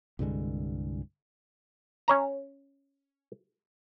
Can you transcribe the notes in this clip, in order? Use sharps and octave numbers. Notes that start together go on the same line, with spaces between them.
C2 G2 D3 G#3
C#4 C#5 A#5